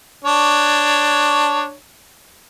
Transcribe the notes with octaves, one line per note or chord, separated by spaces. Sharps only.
D4 C#5